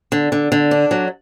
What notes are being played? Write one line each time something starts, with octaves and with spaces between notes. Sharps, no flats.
D3
D3
D3
D4
F#3